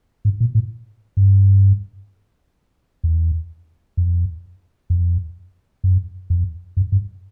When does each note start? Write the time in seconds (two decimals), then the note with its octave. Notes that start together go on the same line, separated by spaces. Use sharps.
0.25 G#2
0.40 A#2
0.55 A2
1.17 G2
3.04 E2
3.97 F2
4.90 F2
5.84 F#2
6.30 F2
6.77 F#2
6.92 G2